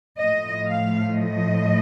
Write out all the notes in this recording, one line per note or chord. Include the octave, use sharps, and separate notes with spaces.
A2 F3 A3 D#5
F5
D#5